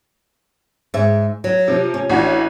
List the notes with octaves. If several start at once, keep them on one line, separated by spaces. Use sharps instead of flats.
G#2 E5
F#3
C3 F3
C#4
A1 D4 F#4